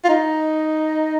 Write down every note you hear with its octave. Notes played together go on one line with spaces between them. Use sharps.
F4
D#4